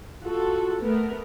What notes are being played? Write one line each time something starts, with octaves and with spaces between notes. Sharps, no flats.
F4 F#4 A4
A3 B3 A#4